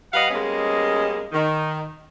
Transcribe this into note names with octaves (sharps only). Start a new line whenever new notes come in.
G3 B4 D#5 F5 F#5
G3 G#3 A#3 B3 C#4 D#5
D#3